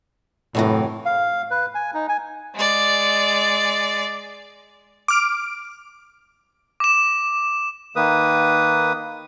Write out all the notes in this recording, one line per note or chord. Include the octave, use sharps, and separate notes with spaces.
F#2 A2 C3 E3
F5
B4
G#5
D#4
G#5
G#3 D5
D6 F6 D7
D6 E7
D#3 A#3 B4 D#6